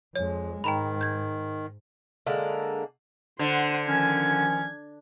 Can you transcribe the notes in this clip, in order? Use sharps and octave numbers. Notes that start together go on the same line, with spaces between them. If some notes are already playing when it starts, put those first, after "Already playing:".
F2 G#3 C#5
G#2 D#3 G5 A#5 B5
G6 G#6
D3 G#3 A#3
D3 C5 F#5
D#3 F3 C#4 G#6